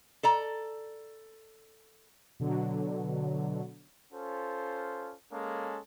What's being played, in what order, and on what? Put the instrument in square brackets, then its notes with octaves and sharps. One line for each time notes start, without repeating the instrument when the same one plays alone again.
[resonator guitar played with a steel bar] A4 D5 A#5
[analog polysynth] B2 D3 F#3
[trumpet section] C#4 F4 A4 C5
G#3 A#3 C#4 A4